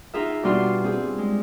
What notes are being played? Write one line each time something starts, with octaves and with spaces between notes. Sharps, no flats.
D#4 F4 G#4 E5
B2 G3 D4 F4 C6
C4 G#4
G#3